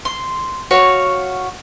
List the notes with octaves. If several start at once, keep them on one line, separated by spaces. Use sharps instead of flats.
C6
F#4 C#5 F5